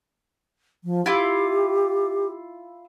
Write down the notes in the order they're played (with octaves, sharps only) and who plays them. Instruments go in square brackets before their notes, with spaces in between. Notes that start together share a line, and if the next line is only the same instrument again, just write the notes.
[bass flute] F3
[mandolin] E4 F4 [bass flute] G4